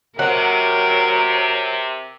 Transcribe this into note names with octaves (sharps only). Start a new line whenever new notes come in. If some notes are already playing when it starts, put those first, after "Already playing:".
C3 F#3 A#4 F#5